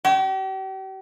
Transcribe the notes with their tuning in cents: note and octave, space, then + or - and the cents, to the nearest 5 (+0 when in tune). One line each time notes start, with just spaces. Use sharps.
G4 -40